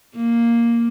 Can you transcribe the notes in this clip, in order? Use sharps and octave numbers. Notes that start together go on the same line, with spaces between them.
A#3